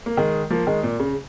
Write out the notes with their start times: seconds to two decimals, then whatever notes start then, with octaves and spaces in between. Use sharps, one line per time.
0.06 A#3
0.17 D#3 G#3
0.50 F3 A#3
0.67 D#3 G#3
0.83 A#2
1.00 C#3